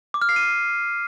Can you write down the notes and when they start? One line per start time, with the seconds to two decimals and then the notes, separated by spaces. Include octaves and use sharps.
0.14 D6
0.22 F6
0.29 C7
0.36 D#7